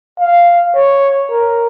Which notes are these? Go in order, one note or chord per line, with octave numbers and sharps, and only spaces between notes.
F5
C#5
A#4